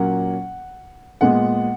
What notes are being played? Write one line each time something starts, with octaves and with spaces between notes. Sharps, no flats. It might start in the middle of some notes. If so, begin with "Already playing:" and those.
Already playing: A#2 F#3 A#3 C#4 F#5
A#2 G#3 B3 F#5